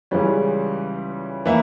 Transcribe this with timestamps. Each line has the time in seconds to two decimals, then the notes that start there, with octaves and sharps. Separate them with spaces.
0.11 C#2 C#3 E3 G3 C#4
1.45 E3 A#3 E4